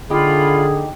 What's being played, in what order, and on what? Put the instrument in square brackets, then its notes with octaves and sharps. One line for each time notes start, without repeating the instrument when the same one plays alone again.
[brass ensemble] D3 [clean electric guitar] D#4 G4 [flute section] F4 B5 [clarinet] G#4